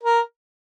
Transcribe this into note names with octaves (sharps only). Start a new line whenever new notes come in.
A#4